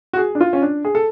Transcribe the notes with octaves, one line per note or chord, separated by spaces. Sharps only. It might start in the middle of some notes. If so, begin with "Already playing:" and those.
F#4
G#4
D4
F4
C#4
D4
G#4
A4